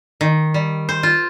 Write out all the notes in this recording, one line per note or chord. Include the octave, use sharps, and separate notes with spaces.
D#3
G3
C5
F4